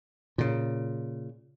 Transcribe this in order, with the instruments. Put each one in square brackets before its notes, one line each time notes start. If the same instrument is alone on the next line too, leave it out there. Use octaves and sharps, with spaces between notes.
[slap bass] A#2 C#3